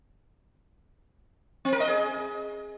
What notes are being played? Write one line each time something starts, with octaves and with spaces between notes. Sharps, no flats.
C4
A#4
D#5
G#4